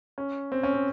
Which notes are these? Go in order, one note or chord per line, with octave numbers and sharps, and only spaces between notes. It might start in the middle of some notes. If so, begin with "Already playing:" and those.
C#4
C4
C#4
C4